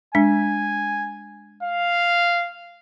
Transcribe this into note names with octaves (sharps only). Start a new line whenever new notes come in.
G#3 D4 G#5
F5